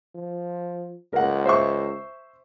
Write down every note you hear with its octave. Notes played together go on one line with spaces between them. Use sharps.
F3
C#2 A#4 F#5
C5 E5 C#6